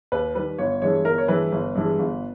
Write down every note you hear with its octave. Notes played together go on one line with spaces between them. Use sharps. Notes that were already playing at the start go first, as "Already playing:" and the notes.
D#2 B4
D#3 G3 B4
G1 C#5
G2 E3 G#3 C#5
G1 A#4
C#5
G2 E3 G#3 B4
G1
G2 E3 G#3
G1